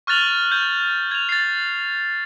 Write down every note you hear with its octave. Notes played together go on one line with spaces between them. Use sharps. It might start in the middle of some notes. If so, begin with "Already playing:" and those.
C#6 F6 F#6 A6 F7 F#7
G6 G#6
G#6 F7
A6 C7